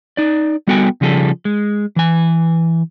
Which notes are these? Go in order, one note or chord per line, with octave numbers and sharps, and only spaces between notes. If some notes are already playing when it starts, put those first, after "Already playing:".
D#4 D5
G3 B3 F#4 A4 G5 G#5
C#3 F3 G3 G#4 A4
G#3
E3 G#5